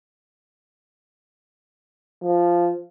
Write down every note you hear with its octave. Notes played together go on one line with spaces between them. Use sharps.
F3